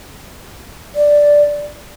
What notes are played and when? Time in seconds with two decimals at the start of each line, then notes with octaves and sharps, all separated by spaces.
0.95 D5